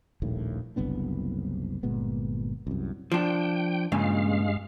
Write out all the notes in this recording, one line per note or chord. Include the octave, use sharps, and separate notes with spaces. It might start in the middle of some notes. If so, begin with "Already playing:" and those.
D#1 A#1 D#2 A2
F#1 C2 B3 D4
G1 A#2 G#3 B3
C2 F#2
F3 D4 G5
C#2 G2 A#2 C#3 G#3 F5